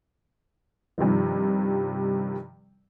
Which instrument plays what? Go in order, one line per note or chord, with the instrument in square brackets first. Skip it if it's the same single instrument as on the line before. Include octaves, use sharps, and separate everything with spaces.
[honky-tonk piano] G2 C3 D#3 F3